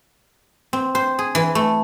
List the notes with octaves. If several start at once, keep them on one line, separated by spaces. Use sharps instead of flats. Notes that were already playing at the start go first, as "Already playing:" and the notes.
C4
C5
G#4
E3
A3